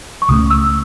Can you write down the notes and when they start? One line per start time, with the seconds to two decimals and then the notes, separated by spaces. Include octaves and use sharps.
0.22 C#6
0.29 C#2 C#3 F#3 A3 D#6
0.50 E6